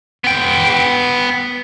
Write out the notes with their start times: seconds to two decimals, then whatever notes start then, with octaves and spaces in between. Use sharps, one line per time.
0.24 B3 G5